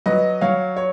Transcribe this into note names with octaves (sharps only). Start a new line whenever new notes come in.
F#3 B4 D#5
F#3 C#5 F5
C#5